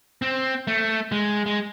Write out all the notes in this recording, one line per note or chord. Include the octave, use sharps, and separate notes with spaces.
C4
A3
G#3
G#3